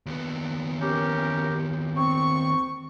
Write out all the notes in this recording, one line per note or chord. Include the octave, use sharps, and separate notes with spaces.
D#2 B3
C#4 G4 A#4
C4 C#6